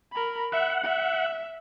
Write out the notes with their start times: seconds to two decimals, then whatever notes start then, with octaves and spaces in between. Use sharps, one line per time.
0.12 A#4 B5
0.52 E5 F#5
0.84 E5